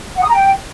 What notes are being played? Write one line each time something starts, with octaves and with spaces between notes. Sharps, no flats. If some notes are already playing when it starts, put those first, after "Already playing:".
F#5
D#6
A#5
G5